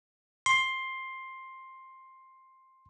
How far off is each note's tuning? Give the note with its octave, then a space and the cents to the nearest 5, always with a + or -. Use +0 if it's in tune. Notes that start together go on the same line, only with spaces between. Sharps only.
C6 +10